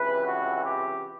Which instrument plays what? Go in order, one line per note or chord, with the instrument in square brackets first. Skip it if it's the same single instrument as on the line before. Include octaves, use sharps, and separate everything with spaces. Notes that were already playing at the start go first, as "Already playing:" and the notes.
Already playing: [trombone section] C#2 C3 E3 B4
F#4
G4